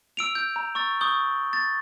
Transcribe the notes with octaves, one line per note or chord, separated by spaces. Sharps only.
E6 D7 F7
G6
A#5
C#6 E6 A6
C#6 D#6 G6 G7
A6